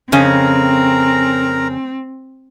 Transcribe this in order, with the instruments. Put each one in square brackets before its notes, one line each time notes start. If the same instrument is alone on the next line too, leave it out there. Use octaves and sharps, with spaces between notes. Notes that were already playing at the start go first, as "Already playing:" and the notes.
[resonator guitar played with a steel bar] F2 C#3 C#4 [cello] C4 [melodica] A#4 A#5